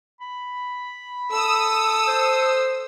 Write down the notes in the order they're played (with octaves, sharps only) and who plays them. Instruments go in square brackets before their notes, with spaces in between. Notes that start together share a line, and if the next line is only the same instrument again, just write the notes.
[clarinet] B5
[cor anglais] A4 [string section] D#6 E6
[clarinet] C5